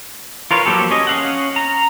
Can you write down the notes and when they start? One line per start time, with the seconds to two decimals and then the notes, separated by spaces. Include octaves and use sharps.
0.51 F4 A#4 B4 C#5 F5
0.65 F3 F#3 A#3 G4 A4
0.91 C#4 D#5
1.07 C#4 F5 F#5
1.56 A#5